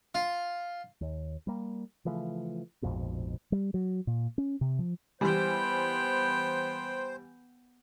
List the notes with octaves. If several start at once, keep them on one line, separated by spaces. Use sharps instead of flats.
F4
D#2
G3 A#3
C#3 E3 F3 A3
A#1 F2 G#2 B2
G3
F#3
A#2
C#4
C3
F3
E3 G3 B3 C5 G5